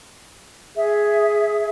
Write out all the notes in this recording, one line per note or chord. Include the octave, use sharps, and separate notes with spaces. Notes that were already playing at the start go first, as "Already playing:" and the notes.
G#4 E5